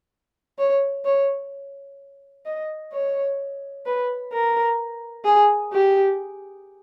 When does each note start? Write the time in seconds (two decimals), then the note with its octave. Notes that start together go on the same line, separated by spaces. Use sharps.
0.58 C#5
1.05 C#5
2.46 D#5
2.93 C#5
3.86 B4
4.32 A#4
5.25 G#4
5.73 G4